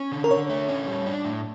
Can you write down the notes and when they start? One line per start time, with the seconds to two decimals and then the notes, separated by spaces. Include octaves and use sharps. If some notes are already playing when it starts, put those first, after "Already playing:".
Already playing: C#4
0.12 D3
0.24 A#4
0.31 D3 C#5
0.49 A3
0.69 C#4
0.87 G3
1.06 D4
1.25 A2